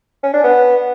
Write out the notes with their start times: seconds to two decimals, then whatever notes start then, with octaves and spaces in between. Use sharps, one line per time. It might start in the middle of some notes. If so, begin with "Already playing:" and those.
0.23 C#4
0.34 D4
0.44 B3